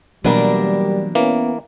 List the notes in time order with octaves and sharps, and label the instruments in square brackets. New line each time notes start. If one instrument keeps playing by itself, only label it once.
[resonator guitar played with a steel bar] B2 D4 A#4 [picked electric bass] E3 F#3 A#3 [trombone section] G3
[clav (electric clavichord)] E3 A#3 [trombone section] B3 C#4